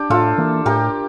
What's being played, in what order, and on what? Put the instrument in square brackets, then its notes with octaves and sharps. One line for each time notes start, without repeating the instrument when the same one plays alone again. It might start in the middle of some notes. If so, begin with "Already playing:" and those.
Already playing: [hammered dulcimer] D4 G4
[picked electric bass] A2 [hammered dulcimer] F4 A4
[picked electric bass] E3 A#3
[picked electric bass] A2 [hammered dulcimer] G4 A#4